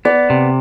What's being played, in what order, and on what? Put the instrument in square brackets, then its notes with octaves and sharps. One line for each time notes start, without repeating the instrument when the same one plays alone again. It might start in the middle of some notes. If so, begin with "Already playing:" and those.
[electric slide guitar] B3 [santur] D5
[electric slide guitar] C3